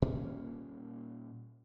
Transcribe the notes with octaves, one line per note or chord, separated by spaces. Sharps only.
A#2 G3 A#3 C#4